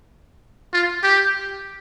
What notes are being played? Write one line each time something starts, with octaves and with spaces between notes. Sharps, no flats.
F4
G4